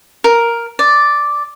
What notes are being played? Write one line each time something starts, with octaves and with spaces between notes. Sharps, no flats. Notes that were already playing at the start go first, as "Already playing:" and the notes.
A#4
D5